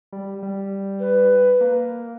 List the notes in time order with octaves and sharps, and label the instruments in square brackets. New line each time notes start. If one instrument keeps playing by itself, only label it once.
[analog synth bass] G3
G3
[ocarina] B4
[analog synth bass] A#3